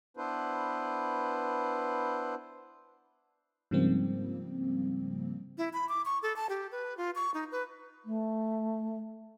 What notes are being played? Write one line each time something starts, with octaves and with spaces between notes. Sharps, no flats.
B3 D4 E4 B4 C5
G#2 C#3 F3 G3 A#3 C4
E4
B5
D6
C#6
A4
A5
G4
B4
F4
C#6
D#4
B4
A3